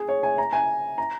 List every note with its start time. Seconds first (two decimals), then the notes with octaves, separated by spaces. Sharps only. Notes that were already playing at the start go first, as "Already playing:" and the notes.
Already playing: G#4
0.09 C#5
0.23 G#5
0.38 A#5
0.53 G#5
0.98 A#5